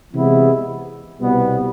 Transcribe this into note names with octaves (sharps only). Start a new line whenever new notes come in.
C3 E3 G#3 B3 E4
C2 B2 G3 B3